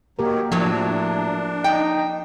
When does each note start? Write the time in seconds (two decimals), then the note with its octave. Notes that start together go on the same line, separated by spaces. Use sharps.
0.19 D#3 F#3 A#3 G4 A#4
0.52 A2 F3 F#3 D4
1.64 D#4 G5